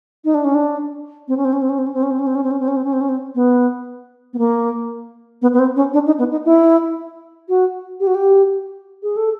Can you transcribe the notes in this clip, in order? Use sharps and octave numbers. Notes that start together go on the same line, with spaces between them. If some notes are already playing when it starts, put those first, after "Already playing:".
D#4
D4
C#4
D4
C4
C#4
C4
C#4
C4
C#4
C4
C#4
C4
C#4
C4
C#4
C4
C#4
C4
C#4
C4
C#4
C4
C#4
C4
C#4
C4
B3
B3
A#3
B3
B3
C4
C#4
D4
D#4
B3
D#4
E4
F#4
G4
F#4
G4
G#4
A4